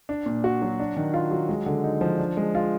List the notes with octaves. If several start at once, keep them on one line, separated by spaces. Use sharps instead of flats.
D4
A#2
F#4
F#3
D4
D#3
F4
F#3
G#3
D3
D#4
F3
D4
G#3
F4